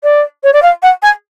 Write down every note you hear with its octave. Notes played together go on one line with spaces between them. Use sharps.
D5
C#5
D5
F5
F#5
G#5